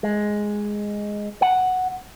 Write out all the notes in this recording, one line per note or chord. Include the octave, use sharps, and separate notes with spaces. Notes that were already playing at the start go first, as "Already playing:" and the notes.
G#3
F#5